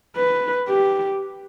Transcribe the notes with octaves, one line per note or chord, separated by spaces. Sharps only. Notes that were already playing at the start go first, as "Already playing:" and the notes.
B4
G4